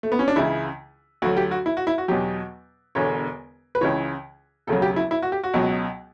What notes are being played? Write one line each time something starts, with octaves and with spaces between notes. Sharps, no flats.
A3
B3
C#4
D4
C#2 C#3 E3 E4
D2 D3 F#3 F#4
G4
F#4
E4
F#4
E4
F#4
E2 B2 F#3 G4
E1 E2 D3 C#5
B4
C#2 C#3 E3 C#5
E1 D2 C#3 F#3 A4
G4
E4
E4
F#4
G4
F#4
C#2 B2 F#3